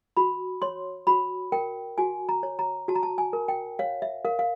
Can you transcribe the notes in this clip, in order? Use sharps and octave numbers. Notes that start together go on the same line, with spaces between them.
F#4 B5
C#5 C6
F#4 B5
A#4 G5
F#4 G#5
A#5
C#5
A#5
F#4 A5
A#5
A5
G#5
A#4
G5
C#5 F5
E5
A#4 F5
F5